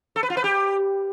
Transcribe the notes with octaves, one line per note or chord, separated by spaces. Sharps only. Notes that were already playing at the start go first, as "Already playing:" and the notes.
A4
B4
F4
B4
G4